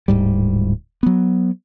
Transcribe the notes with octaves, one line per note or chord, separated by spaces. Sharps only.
D1 G#2 G3
F#3 B3